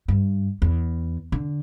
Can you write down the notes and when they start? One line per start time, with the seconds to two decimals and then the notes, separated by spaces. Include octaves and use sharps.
0.08 G2
0.62 E2
1.32 D3